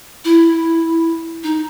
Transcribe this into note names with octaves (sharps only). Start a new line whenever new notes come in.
E4
D#4